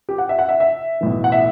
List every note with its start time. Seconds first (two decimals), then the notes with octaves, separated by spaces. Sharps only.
0.09 G4
0.18 F#5
0.29 E5
0.39 F#5
0.49 E5
0.60 E5
1.01 B1 A2 E3
1.24 F#5
1.32 E5